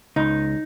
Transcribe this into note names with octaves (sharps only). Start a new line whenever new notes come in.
C#2 D#4